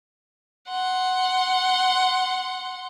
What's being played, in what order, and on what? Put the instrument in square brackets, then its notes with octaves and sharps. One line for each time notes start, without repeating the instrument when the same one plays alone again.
[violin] F#5 C6